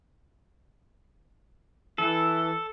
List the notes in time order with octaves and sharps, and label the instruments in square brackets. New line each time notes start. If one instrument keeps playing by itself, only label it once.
[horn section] E3 [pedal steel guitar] A4